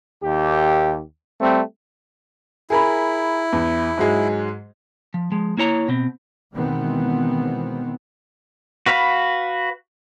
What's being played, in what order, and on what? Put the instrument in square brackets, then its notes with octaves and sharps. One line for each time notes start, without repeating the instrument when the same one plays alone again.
[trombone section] D#2 G4
G3 A3 C4
[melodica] E4 [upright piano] G#4 A#4 B5
[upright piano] E2
G#2 F#3 G#3
[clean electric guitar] F3
F3 G#3
A#3 E4 C#5 A#5
B2 C4
[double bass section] B2 D#3 E3 G#3 B3 C4
[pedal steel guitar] F#4 B4 F5 B5